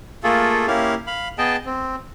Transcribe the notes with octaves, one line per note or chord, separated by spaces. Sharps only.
A3 A#3 F4 G#4 A4
A#3 C#4 E4 G4 F5
F5 B5
B3 G#4 D#5 G5 A5
C4